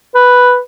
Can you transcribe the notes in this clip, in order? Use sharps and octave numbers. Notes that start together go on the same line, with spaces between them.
B4